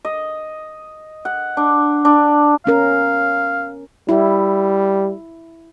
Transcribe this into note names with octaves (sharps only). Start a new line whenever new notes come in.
D#5
F#5
D4
D4
B3 C#4 A#4 F5
G3 E4